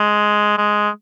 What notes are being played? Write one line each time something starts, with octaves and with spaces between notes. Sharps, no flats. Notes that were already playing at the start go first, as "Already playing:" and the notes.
Already playing: G#3
G#3